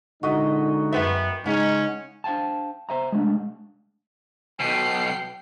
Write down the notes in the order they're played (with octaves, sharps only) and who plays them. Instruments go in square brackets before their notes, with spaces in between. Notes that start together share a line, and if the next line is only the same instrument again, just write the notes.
[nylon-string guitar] A#2 [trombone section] D3 G#3 D#4 [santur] F#4 D#5 E5
[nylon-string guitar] F#2 B4 E5 [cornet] B3 [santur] G5 C6
[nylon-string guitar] C#3 [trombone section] G#3 D#4 [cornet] C#4 [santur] F#5
[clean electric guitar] D4 C5 F5 G5 A5
C5 E5 A#5
G#3 A3 D4
[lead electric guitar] B1 B2 [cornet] G5 [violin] C7